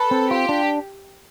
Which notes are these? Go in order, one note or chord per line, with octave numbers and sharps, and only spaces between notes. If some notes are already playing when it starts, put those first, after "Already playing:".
Already playing: A4 B4
C4
F4 G4
D4